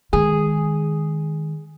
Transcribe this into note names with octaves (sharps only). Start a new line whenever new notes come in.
D#3 G#3 G#4